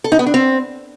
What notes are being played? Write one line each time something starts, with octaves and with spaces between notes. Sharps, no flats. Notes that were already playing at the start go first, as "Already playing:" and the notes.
A4
D#4
B3
D4
C4